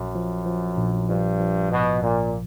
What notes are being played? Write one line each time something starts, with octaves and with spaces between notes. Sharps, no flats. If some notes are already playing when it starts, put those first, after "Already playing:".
Already playing: A#1 F#2
F3
F3
A#1
G2 F3
F3
G#2 B2
A#1 A#2